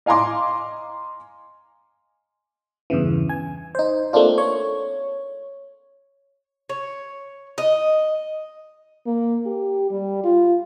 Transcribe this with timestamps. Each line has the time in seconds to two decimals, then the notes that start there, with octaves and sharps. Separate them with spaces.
0.06 D#5 F5 G#5 A#5 C6 D6
2.90 E2 G2 C#3 E3
3.29 G#5
3.75 D#4 C5
4.13 A3 A#3 C4 D4 F4
4.38 C#5
6.69 C#5
7.58 D#5
9.06 A#3
9.46 G4
9.91 G3
10.24 F4